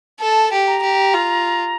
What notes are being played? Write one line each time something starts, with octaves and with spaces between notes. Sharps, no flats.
A4 A5
G4
A#5
G4
F4